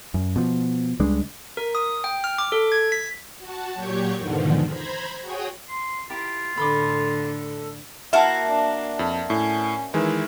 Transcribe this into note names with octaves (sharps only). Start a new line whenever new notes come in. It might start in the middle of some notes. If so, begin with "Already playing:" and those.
F#2
B2 F3
C#2 G3 G#3 D4
A#4
D#6
G5
F6
D6
A4
G#6
B6
F#4 A5
A#2 F#3 G4 C#5 C#6 G6
E2 G#2 B2 D3 D#3 F3
C5 A#5 B5 G#6
F#4 G#4 C#5 G5 D#6
C6
E4 F4 G4 A#4
A2 D3 A4 B5 C6 D6
A#3 E4 F#4 A#4 E5 A5
D4
F2
A2 C#4
D#3 E3 G#3 E4